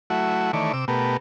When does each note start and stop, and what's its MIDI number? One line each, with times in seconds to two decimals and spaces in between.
0.10 0.52 54
0.10 0.52 57
0.10 0.52 64
0.10 0.52 66
0.53 0.72 51
0.53 0.72 52
0.53 0.72 57
0.53 0.72 73
0.53 0.72 74
0.73 0.85 48
0.73 0.85 86
0.73 0.85 88
0.88 1.17 47
0.88 1.17 57
0.88 1.17 59
0.88 1.17 67
0.88 1.17 70